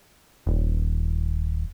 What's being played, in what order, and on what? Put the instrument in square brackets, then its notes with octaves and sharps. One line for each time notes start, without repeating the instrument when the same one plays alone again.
[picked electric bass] D#1